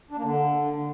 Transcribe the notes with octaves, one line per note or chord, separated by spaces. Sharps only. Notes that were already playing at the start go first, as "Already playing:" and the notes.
D4
A#3
D3